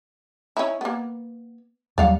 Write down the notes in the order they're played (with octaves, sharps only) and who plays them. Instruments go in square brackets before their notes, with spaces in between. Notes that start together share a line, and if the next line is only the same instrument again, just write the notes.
[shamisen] C#4 D#4 E4
A#3 B3
[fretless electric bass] D#2 F#3 G3 [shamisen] D5 F5 F#5